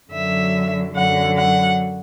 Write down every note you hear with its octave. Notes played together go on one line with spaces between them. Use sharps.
F#2 D3 F#3 E5
F#2 D3 F#3 F#5
F#5